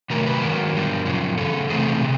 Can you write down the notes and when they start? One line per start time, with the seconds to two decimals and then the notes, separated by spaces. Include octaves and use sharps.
0.10 C3 D#3 F#3 A3 A#4
0.26 B4
0.42 G#2 D#3 F#3 A#4
0.73 G2 D3 G3
1.05 F#2 C#3 F3
1.37 E2 C#3 A4
1.69 C3 E3 A3 C4 G#4
2.02 C3